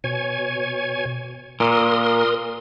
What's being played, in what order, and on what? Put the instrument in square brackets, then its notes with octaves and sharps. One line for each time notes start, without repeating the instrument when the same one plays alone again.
[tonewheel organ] B2 C#5 G#5
[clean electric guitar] A#2 [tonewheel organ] A#4 C6 D#6